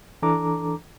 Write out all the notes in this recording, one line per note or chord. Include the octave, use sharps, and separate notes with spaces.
E3 D4 A4 A#5 D6